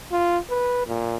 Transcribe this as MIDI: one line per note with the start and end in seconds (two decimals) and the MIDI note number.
0.12 0.38 65
0.50 0.83 71
0.87 1.17 46